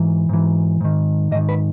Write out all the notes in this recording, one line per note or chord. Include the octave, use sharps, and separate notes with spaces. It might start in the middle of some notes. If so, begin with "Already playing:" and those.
Already playing: G#2 E3
G#2 E3
G#2 D#3
G#2 D#3 D#5
B4